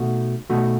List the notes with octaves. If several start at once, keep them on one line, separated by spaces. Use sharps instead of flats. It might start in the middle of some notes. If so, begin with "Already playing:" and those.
Already playing: B2 A3 D#4 F#4
B2 A3 D#4 F#4